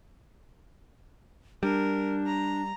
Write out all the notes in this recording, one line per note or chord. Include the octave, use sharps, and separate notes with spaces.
G3 D4 A#4
A#5